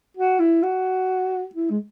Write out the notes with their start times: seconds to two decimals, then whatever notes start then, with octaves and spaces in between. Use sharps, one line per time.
0.17 F#4
0.40 E4
0.63 F#4
1.55 E4
1.70 G#3